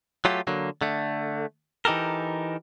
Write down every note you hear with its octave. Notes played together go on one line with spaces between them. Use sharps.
F#3 A3 F4 G4
D3 F#3 A#3
D3 A3
E3 D#4 G4 A4 A#4